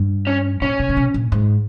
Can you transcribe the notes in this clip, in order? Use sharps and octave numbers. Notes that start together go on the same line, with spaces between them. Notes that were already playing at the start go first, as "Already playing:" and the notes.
Already playing: G2
C#4
A#2 C#4
B2
A#2
B2
A#2
G#2